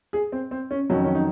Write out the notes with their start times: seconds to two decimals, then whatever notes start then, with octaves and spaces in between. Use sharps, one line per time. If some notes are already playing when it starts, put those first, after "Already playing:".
0.13 G#4
0.32 C4
0.51 C4
0.71 C#4
0.90 F2 D#3 F#3 C#4
1.04 C#4
1.15 D#4